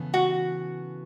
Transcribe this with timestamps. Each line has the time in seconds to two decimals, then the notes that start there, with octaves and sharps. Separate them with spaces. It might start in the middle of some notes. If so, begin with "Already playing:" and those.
Already playing: C#3 E3 B3 A4
0.14 F#4